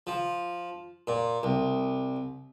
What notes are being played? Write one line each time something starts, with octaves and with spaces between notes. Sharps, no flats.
F3
A#2
C2